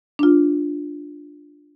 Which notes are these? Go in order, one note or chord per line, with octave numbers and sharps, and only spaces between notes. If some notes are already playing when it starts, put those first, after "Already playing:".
D4 F4